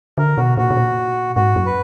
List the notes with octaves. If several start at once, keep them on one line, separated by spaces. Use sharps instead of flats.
D3 A#4
B2 F#4
A#2 F#4
B2
A#2
G#2 F#4
F#2
B4